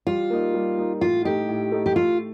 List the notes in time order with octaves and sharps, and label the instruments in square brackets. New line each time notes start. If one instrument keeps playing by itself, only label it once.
[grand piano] G3 [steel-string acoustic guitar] F4
[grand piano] A#3 D#4
G3
A#3 D#4
[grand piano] A2 [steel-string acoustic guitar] F4
[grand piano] A3 D#4 [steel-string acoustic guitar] G4
[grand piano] A2
A3 D#4
[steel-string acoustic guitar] G4
[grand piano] A3 [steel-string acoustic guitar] F4